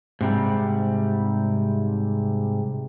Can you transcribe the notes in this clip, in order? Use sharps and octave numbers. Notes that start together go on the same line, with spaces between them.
G#2 C3 G3